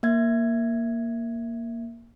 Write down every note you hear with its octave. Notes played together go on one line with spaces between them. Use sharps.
A#3 E5 G#6